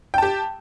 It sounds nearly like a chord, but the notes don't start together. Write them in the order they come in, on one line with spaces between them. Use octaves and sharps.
G5 A5 G4